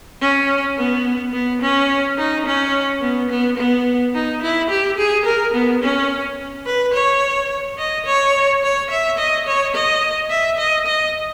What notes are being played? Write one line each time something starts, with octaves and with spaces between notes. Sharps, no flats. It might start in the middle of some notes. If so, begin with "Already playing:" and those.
C#4
B3
B3
C#4
D#4
C#4
B3
B3
B3
D#4
E4
G4
G#4
A#4
B3
C#4
B4
C#5
D#5
C#5
C#5
E5
D#5
C#5
D#5
E5
D#5
D#5